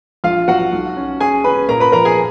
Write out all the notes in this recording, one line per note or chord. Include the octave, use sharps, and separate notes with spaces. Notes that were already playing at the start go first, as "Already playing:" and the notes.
A#1 F4 F5
F#3 F#4 F#5
B1
C#4
C#4 G#4 G#5
C#4 B4 B5
A#2 A#4 A#5
B4 B5
F3 A#4 A#5
G#4 G#5